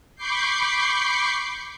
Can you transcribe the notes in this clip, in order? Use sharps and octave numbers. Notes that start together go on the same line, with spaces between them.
B5 C#6 D6 G6 C7